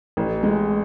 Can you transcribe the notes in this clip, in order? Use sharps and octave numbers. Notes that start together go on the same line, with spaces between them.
A1
G#3